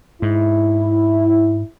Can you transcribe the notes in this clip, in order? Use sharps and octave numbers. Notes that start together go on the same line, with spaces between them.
G#2 E4